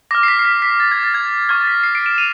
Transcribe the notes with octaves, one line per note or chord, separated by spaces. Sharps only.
D6 F6 A#6
C7
B6
C7
B6
B6
A6
G#6
A6
G#6
C#6 F6 G#6
A6
B6
A#6
C7
C7 D7
D7 E7
D#7 F7